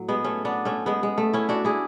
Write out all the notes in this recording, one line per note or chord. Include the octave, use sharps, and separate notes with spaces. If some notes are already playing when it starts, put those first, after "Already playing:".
Already playing: A2 F#3
G#3 B3
A3 C#4
B3 D4
A3 C#4
G#3 B3
G#3
A3
C#4 E4
D4 F#4
E4 G#4